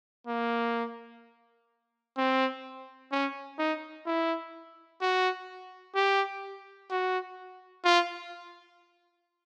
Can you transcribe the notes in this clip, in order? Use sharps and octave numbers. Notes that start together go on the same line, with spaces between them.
A#3
C4
C#4
D#4
E4
F#4
G4
F#4
F4